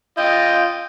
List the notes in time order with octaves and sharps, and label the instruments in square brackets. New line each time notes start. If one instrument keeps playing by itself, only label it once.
[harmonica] F4 D#5 [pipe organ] G5